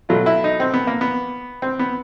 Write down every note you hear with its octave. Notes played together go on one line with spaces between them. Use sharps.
B2 F#3 A3 F4
E4
D#4
C4
B3
A#3
B3
C4
B3